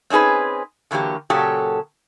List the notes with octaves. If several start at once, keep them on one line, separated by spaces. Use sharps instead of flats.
C4 C#4 D#4 G#4 B4
D3 E3 F#3 A#3 G4
A#2 C#3 F#3 G4 A4